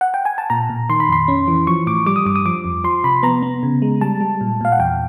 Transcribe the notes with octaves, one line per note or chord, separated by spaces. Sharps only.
F#5
G5
G#5
A5
A#2 A#5
A#2
D#3 C6
B5
F2 C6
C#4
E3
F3 C#6
A2 D6
G3 D6
D#6
G2 D6
D#6
F3 D6
F2
F3 C6
C3 B5
B3 A#5
B3
C#3
G#3
G3 A5
G3
A#2
A#2 F5
F#5
E2 G5